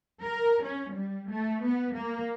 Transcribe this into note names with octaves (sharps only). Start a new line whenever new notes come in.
A#4
C#4
G3
A3
B3
A#3